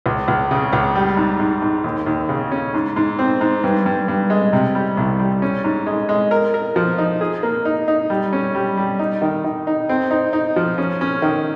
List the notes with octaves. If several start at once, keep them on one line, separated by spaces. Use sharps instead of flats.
C#2
C#2
C#3
C#2
G3
G#2
G#2
G#2
D#2
D#2
C#3
C#4
G#2
G#2
C4
G#2
G2
G2
G2
G#3
C3
G3
C2
G3
C#4
G#2
G#3
G#3
A#4
A#4
F3
D#4
G#4
A#3
D#4
D#4
G3
C#4
G3
G3
D#4
D#3
D#3
D#4
C4
D#4
D#4
F3
C#4
C#4
D#3